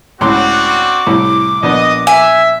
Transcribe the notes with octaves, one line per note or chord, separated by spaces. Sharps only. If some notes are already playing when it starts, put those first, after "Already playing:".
C#2 A2 C4 D4 F#4 C6 D6
C2 A2
A#1 B3 D4 D#5
E5 G#5